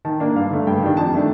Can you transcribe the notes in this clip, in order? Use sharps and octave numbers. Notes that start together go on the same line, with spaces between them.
D#3 A5
A#3 D4
G2 F5
D3 A3
G2 G5
D#3 G3 D4
F2 A5
D#3 A3 D4